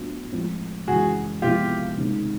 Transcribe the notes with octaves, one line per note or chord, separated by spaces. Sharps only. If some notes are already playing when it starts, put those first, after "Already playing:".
Already playing: A2 F#3 B3 D4 F4
A2 F3 G#3 C4
F#2 C#3 E3 G#3 F#4 G#4
C3 F3 G#3 B3 E4 F4 G4
C#2 C3 D#3 G#3 C4